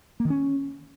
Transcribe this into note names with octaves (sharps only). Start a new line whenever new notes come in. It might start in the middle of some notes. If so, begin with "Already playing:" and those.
A#3
D#3
C#4